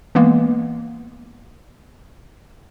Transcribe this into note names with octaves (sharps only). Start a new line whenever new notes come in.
E3 G#3 A#3 B3